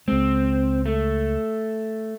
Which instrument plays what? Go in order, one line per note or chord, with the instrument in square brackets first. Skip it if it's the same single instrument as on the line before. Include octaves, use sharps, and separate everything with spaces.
[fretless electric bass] C#2 G#3 [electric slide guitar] C4
[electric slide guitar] A3